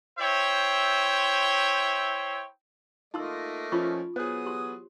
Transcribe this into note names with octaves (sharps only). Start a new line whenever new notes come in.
E4 C5 C#5 E5 G5
A3 A#3 D#4 F4 D#5 C6 E6
F3 C#4 F4 B5 C#6
F#3 B3 G#4 C5 C#5 D#6
G4 C6